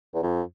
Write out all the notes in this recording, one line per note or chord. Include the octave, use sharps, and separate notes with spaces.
E2
F2